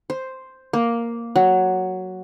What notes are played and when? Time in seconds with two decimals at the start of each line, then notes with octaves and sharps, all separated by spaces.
0.10 C5
0.73 A#3
1.36 F#3